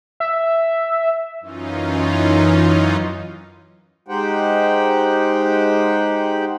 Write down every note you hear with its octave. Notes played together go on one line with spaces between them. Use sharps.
E5
F#2 E3 C#4 D#4 F4
G#3 D#4 G4 C5 F#5 G5